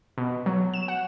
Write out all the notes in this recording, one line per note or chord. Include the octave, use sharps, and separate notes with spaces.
B2
F#3
E7
F#5